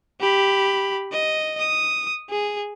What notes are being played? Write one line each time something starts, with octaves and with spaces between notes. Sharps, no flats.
G4 B5
D#5
D#6
G#4